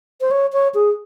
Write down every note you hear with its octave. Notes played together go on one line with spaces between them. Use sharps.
C5
C#5
C#5
G#4